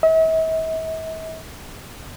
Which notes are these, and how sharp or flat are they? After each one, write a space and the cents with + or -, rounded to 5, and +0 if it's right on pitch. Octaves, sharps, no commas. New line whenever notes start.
E5 -45